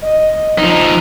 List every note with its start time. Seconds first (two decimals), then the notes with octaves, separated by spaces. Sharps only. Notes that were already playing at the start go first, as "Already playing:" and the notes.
0.02 D#5
0.58 F3 D#4